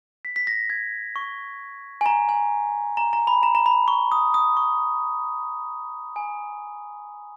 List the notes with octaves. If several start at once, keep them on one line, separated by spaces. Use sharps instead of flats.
B6
B6
A#6
G#6
C#6
G#5
A#5
G#5
A#5
A#5
B5
A#5
A#5
B5
C#6
D#6
D#6
C#6
G#5